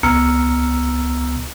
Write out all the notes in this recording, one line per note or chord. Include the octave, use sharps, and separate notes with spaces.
C#2 B3 A#5 E6 F6 C#7